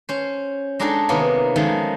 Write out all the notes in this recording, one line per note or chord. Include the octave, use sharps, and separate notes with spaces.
C#4 C5
G#3 D4 D#4 F#4 G#4 A4
C3 D#3 A#3 B3 C#4
D#3 F3 F#3 G#3 A3